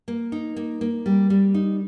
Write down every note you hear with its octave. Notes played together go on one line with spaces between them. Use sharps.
A#3
D#4
A#3
A#3
G3
G3
D#4